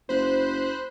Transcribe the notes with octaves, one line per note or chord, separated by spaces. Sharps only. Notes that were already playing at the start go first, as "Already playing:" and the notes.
F#1 C5 B5 F#6